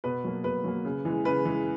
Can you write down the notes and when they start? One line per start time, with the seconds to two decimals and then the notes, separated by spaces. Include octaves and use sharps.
0.04 B2 B4
0.24 F#3 A#3
0.44 B2 B4
0.64 F#3 A#3
0.85 C#3
1.05 E3 G#3
1.25 C#3 B4
1.45 E3 G#3